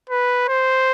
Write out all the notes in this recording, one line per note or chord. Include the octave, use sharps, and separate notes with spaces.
B4
C5